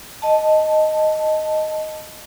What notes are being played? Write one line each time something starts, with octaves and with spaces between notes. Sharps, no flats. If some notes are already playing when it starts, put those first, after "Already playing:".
D#5 A5